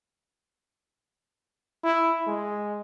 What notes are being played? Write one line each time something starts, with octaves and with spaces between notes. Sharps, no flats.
E4
G#3